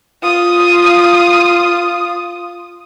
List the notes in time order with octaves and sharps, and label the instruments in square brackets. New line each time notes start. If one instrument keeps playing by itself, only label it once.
[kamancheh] F4 D#6